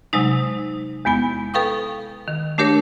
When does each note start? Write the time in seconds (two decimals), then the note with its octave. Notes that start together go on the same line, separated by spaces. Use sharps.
0.13 C3 F#3 G#3 D#4
1.05 E2 G#3 B3 G#5
1.54 A4 B4 F5 G5 C#6 D#6
2.28 D#3
2.58 A3 D4 G4 A#4 C#5